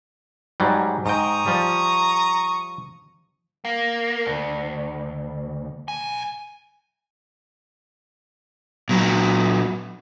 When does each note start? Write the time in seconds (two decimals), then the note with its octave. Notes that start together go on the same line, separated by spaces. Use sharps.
0.60 G#2 F#3 G3
1.06 G#2 G5 A#5 C#6 D#6
1.46 F3 G3
3.65 A#3
4.26 D2
5.88 B1 G#5
8.89 A#2 F#3